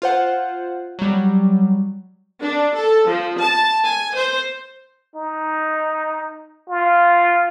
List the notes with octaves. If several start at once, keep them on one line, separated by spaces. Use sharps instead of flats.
F4 C5 F#5
F#3 G3
D4
A4
F3
A5
G#5
C5
D#4
F4